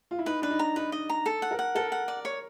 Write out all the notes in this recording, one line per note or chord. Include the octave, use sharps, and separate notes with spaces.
F4
E4
D#4 B4
D4 B4
D#4
A#5
D#4 B4
D#5
A#5
A4
F#5
A#4
F#5
A4 A#4
F#5
D5
C#5